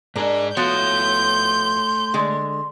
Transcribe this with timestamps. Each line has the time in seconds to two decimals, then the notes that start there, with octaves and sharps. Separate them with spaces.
0.16 G#2 D4 G#4 A#4 D#5
0.57 F3 A3 B3 F#4 C#5 C6 G6
2.14 D3 G#3